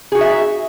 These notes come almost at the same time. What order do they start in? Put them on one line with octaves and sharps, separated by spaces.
G#4 F#4 D#4 E5